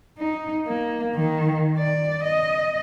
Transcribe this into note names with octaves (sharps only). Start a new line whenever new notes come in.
D#4
A#3
D#3
D5
D#5